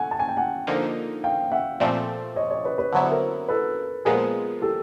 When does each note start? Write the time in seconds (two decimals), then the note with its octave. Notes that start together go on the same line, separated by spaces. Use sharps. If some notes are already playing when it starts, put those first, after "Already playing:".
Already playing: A3 F#5 G#5
0.11 A5
0.20 G#5
0.29 G5
0.37 F#5 G#5
0.67 D3 F3 A#3 D#4
1.24 F5 G5
1.52 E5 F#5
1.80 A#2 F3 A3 C4 D5 E5
2.36 C#5 D#5
2.51 C#5 D#5
2.65 B4 C#5
2.78 B4 C#5
2.92 D3 F#3 B3 E4 C5
3.02 C#5
3.11 A#4 C5
3.49 A4 B4
4.05 A#2 F3 G#3 B3 G#4 A#4
4.62 G4 A4